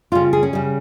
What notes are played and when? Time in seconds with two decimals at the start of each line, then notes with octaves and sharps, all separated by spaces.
0.12 C#3 G3 F4
0.33 G#4
0.43 C#4
0.53 C#3 G3